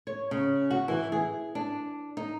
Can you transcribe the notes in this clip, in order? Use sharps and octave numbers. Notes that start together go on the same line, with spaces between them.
C#5
C#3
F#4
E3
G#4
D4
D#4